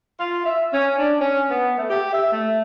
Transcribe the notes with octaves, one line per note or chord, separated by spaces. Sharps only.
F4
E5
C#4
D4
C#4
B3
A3
G4
E5
A3